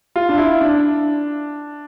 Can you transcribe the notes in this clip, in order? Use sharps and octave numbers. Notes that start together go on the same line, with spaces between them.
F4
D4
E4
D4